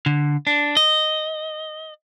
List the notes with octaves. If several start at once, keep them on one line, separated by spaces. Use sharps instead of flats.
D3
D4
D#5